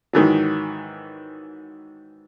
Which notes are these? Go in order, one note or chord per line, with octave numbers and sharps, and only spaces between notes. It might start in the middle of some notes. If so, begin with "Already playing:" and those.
G#2 D#3 E3 F#3